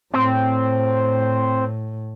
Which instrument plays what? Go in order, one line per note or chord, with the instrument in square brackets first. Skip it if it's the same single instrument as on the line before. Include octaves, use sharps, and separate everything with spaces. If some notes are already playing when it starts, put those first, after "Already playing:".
[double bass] A2 [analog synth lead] C4